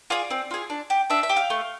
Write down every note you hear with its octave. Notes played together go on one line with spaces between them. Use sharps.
F4 G#4 D5
C4
F4 G#4
D4
G4
D4 E5
E5
G4
F5
A3